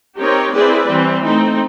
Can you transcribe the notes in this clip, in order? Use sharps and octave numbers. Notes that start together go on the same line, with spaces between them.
C4 D#4 G4 A#4 C#5
C4 E4 G#4 B4 D5
E3 G3 C4
A3 C4 D#4